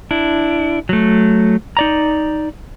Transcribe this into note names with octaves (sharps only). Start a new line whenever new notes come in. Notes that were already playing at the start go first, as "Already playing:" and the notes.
D4 E4
F#3 A3
D#4 D5 A#5